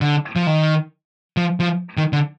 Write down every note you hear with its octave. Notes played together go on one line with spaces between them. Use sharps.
D3
F3
D#3
F3
F3
D#3
D3